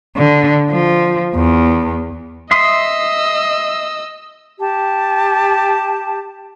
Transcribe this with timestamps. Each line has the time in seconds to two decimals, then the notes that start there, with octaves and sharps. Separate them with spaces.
0.16 D3
0.70 F3
1.35 E2
2.51 D#5 E5 C6 D#6 E6
4.59 G4 A5